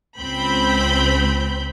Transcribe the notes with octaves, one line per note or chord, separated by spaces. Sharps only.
C#2 C4 B5 G6